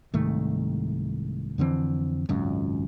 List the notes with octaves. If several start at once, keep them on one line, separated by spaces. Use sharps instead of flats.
C2 G#2 D#3 A3
F2 D3 E3 C4
G#1 C#2 F#2